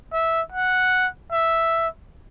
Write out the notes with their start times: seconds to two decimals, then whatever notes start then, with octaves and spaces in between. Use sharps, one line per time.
0.13 E5
0.52 F#5
1.32 E5